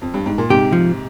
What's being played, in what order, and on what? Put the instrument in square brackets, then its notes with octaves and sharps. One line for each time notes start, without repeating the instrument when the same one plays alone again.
[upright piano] F2
G2
G#2
A#2
[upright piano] G#2 C3 [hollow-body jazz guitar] G4
[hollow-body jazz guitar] F3